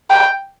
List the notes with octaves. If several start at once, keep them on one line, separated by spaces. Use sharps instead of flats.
G5